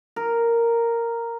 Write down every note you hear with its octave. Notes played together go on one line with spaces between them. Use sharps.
A#4